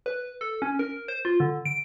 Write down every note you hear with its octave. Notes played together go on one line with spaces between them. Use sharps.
B4
A4
C#4
A#4
C5
F4
D3
D7